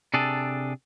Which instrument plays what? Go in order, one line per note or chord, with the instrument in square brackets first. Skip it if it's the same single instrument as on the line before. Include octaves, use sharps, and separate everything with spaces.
[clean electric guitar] C3 D4 G#4 A4